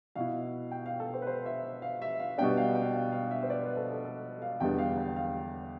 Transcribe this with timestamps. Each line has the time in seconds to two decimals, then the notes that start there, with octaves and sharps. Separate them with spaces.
0.15 B2 B3 E4 F5
0.71 G5
0.86 F5
1.00 A4
1.14 C5
1.22 B4
1.27 C5
1.46 E5
1.82 F5
2.02 E5
2.20 F5
2.38 B2 G3 B3 D4 G5
2.57 F5
2.75 G5
2.94 F5
3.12 F5
3.31 E5
3.42 C5
3.50 D5
3.63 B4
3.77 A4
3.92 A4
4.05 A4
4.42 F5
4.60 E2 D3 G3 B3 G5
4.78 F5
4.97 G5
5.16 F5